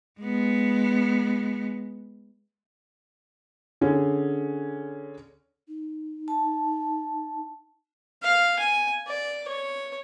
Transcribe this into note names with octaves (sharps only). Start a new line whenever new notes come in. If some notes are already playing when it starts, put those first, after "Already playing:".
G#3 B3
D3 C#4 G#4
D#4
A5
F5
G#5
D5
C#5